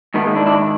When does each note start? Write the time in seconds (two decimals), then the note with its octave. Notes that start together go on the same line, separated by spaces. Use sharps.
0.14 G#2 D#3 A3 B3
0.25 G#3 A#3
0.35 D4 E4
0.46 D4 E4